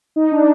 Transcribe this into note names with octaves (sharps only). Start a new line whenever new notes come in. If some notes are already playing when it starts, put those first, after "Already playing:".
D#4
D4